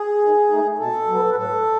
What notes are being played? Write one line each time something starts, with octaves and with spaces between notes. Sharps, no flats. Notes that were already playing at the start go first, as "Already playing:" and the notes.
Already playing: G#4
D#3
A3 D#4
B2 A4
F#3 B3
B4
A2 A4